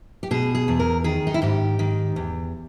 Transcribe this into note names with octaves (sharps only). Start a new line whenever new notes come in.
G4
B2 G#4
G#4
E2
A#4
D#3 G#4
D#4
E4
G#2 G4
D#3
E2